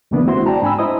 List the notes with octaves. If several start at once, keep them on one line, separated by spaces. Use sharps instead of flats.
D2 C3 E3 A#3 B3 D4
G#3 C4 E4 F#4 C5 C6
D5 G5 A5 A#5
G#2 D4 G#5 B5 E6
E4 C5 D#5 D#6